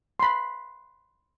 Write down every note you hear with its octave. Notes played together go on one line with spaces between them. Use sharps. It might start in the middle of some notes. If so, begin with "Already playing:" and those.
B5 C6